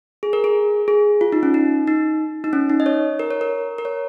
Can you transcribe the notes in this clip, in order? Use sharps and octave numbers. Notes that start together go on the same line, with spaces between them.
G#4
A#4
G#4
G#4
F4
D#4
C#4
D#4
D#4
D#4
C#4
D#4
D#5
C#5
A#4
C#5
A#4
A#4
C#5